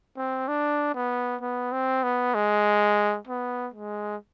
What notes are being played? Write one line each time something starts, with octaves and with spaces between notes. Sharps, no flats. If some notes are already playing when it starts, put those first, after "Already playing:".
C4
D4
B3
B3
C4
B3
G#3
B3
G#3